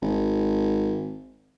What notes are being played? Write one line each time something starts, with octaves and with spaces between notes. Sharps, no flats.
G#1